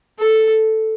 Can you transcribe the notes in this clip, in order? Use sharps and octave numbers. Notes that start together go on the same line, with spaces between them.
A4